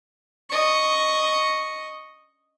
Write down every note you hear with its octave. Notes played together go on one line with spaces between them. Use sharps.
D#5 C#6